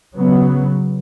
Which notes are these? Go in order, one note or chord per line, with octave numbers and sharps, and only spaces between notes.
C#3 F#3 B3